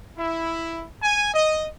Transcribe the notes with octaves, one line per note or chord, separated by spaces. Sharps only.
E4
G#5
D#5